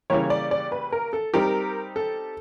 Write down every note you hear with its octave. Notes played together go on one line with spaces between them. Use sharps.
C#3 E3 G3 A#3 C#5
D5
D5
B4
A#4
A4
G3 C4 D#4 G4 A#4
A4